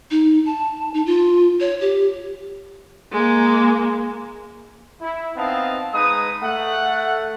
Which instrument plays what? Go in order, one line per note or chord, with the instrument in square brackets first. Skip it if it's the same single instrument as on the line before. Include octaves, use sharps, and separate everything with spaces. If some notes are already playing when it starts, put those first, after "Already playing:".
[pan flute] D#4
A5
D#4
F4
C#5
G4
[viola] G#3 A#3
[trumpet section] E4
B3 C4 D#4 D#5 F5 A5
G#3 D#4 B4 D#6
A3 F#5